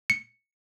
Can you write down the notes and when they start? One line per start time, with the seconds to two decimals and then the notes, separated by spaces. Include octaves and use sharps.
0.10 C#7